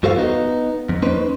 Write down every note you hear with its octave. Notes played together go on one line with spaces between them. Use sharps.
G2 F#4 A4 C5 F5
B3 D#4
F2
A#3 C#4 D#4 B4 C5